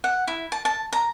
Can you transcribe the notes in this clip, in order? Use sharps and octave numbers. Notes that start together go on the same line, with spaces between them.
F#5
E4
A5
A5
A#5